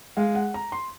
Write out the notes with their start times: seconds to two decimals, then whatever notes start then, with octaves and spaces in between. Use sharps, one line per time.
0.17 G#3 F5
0.35 F#5
0.54 A#5
0.72 C6